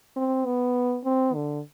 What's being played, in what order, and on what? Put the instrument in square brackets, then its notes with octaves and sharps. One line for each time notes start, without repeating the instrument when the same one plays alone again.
[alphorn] C4
B3
C4
D3